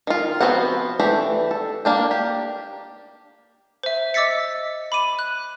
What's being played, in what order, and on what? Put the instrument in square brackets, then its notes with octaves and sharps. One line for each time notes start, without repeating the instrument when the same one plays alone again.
[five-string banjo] D#3 F4
F3 B3 C4 F#4 F#5
E3 A3 D4 G4
A4
A#3 D4 G5
G4
[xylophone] C5 E5
D#5 D6 E6 A6 B6 C#7
B5 D6 D#7
F#6